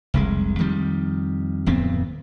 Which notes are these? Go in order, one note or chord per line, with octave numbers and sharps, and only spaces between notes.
F1 C2 G#3
F2 D#3 G3
D1 F2 B3 C4